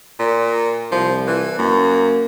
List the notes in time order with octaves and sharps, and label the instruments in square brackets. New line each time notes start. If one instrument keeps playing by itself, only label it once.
[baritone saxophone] A#2
[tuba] C2 [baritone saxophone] F3
[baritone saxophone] E3
[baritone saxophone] F#2 [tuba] A#3